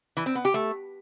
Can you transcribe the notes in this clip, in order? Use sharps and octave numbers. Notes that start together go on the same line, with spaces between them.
E3
C4
B3
G4
A3